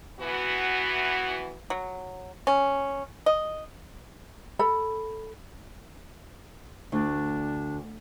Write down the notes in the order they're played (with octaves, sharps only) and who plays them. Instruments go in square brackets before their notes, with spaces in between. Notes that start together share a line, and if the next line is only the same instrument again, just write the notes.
[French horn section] E3 B3 F#4
[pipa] F#3
C#4
D#5
[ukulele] A4 B5
[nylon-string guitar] D2 [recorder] D4